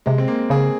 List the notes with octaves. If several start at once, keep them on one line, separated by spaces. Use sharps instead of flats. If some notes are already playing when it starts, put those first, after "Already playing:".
C3 G#3
C4
A#3
C#3 G#4